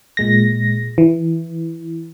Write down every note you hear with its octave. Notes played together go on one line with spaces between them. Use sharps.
A#2 G#3 A#6
E3